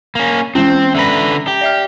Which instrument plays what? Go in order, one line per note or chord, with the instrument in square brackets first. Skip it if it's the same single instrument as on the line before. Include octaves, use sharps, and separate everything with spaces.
[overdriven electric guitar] A#3 C#4
[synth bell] E3 G#3 C#4 [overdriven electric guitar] C4
[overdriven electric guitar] D3 B4 [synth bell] E5 A#5 A#6
[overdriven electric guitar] G4
[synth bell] D5 E5 F6